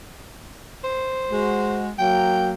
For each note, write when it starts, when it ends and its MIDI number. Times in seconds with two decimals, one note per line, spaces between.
0.84 1.85 72
1.31 1.90 56
1.31 1.90 66
1.98 2.53 54
1.98 2.53 58
1.98 2.48 79